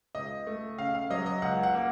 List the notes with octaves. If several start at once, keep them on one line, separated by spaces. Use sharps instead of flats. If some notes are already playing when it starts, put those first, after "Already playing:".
C#2 D#5
A3
C#3 F5
F5
F#3 D#5
D#5
C#2 F#5
F#5
A#3